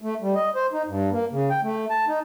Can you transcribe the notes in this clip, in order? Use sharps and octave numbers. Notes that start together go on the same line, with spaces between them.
A3
G3
D#5
C5
D#4
G2
A#3
C#3
G5
A3
A5
D#4